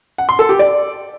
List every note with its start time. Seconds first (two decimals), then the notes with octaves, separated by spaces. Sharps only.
0.18 F#5
0.29 C6
0.39 A4
0.49 G4
0.59 D5